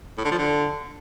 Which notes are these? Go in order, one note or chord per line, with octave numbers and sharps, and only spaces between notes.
A2
D3
F3
D3